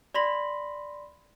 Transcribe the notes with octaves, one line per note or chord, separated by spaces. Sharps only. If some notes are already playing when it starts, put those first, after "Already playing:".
D5 B5 C6 A#6 B6 F#7